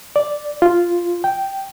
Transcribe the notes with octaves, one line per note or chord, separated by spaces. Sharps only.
D5
F4
G5